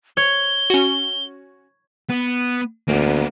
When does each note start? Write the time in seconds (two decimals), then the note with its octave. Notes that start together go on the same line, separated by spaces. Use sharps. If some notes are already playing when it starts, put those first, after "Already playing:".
0.17 C#5 G7
0.70 C#4 F#4
2.09 B3
2.89 D2 A#3 B3